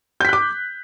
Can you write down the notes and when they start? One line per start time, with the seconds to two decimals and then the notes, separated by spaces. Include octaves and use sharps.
0.21 G6
0.25 B6
0.29 F#6
0.33 D6